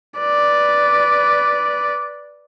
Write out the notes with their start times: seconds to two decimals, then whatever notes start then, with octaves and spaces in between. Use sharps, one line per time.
0.20 B4 D5